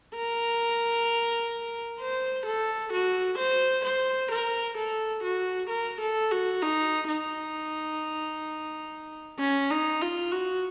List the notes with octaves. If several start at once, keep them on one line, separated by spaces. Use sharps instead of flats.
A#4
C5
A4
F#4
C5
C5
A#4
A4
F#4
A#4
A4
F#4
D#4
D#4
C#4
D#4
F4
F#4